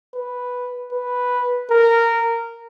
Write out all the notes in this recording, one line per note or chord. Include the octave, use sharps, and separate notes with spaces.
B4
B4
A#4